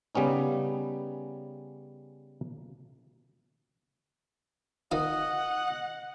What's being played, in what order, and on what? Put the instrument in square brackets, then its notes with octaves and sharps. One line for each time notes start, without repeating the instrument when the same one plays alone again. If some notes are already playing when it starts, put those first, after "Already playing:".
[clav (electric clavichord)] C#3 G3 B3 C#4 D#4
[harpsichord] D#3 D#4 F5 [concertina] D#5 [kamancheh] F#5